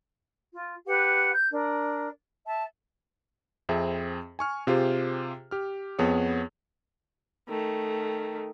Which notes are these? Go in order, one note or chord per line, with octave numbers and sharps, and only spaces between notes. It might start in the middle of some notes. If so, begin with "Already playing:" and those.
F4
G4 B4 F#5
G6
D4 A#4
E5 A5
F2 C4 G#4 E5
G#5 C#6 F6
C3 F4 G4 G#4 C5
G4 F6
F2 B3 G#4 C#5
D#3 A3